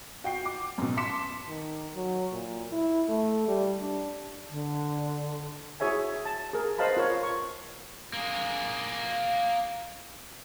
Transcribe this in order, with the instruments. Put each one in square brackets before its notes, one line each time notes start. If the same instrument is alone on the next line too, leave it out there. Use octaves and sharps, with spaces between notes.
[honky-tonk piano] F#4 G5 C7
D6
F#2 B2
A5 C6 D6 B6 C#7 E7
[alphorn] D#3
F#3
A#2
E4
A3
G3
D4
[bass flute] D3
[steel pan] E4 F#4 G#4 C#5 E5 G#5
A5
G#4 A#4
B4 C5 D#5 F5 A5 B5
F4 A#4 C#5
C#6
[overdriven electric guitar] A#3 G#4